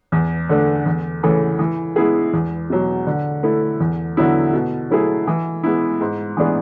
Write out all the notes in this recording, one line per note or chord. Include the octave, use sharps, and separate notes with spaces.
E2
D3 A3 D4
E2
C#3 E3 A3
E3
G#3 B3 E4 G#4
E2
B2 F#3
D3
A3 E4
E2
D3 F#3 B3 E4
B2
F#3 A3 E4 G#4
E3
G#3 B3 E4
G#2
E3 B3 D4 G#4